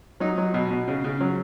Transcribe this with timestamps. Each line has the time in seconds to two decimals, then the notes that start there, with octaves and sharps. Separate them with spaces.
0.20 F#3 D#4
0.38 F#3
0.54 B2
0.71 B2
0.88 C#3
1.04 C#3
1.20 F#3